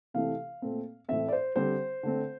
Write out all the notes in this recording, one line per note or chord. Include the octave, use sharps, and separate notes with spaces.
C3 E3 A3 C4 F5
A#2 A3 C4
A2 E3 A3 C4 E5
D5
C5
D3 G3 C4 C5
D3 A3 C4